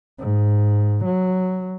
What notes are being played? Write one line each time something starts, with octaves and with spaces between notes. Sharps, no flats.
G#2
F#3